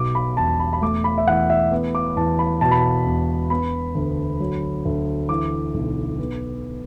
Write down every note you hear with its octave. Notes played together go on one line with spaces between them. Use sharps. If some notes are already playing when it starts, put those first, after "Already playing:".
Already playing: B1 B2 D6
B5
E1 A5
B5
B5
A3 D6
B5
E5
E2 F#5
E5
B3
D6
E2 A5
B5
B2 A5
B5
A5
E1
B3 B5
D2
F#3
D2
E3 D6
B1
B3